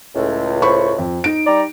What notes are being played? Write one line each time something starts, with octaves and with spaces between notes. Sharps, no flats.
C#2 A2
C5 B5 C#6
F2
D#4 D7
G3 D5 A#5